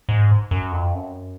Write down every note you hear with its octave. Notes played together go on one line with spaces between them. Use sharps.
G#2
F#2
F2
F#2